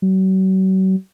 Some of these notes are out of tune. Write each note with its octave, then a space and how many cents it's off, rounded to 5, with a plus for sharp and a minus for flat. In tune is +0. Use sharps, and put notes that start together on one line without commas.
F#3 +40